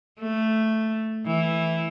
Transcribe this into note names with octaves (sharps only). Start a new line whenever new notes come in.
A3
E3